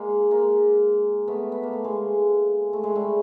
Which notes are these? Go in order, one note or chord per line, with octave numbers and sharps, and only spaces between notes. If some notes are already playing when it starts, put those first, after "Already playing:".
Already playing: G#3 A#3
G#3 A#3
A3 B3
B3
A#3
A3
G#3 A#3
A3
G#3
G3 A3